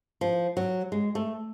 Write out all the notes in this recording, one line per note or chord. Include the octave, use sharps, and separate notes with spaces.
F3
F#3
G#3
A3